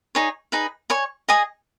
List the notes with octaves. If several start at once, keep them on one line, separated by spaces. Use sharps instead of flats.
D#4 G#4 C#5
D#4 G#4 B4
C#5 G#5 C#6
G#4 D#5 G#5 D#6